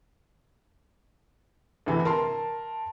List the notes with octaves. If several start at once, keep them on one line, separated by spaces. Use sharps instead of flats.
D2 C3 E3
A#4 A5 C6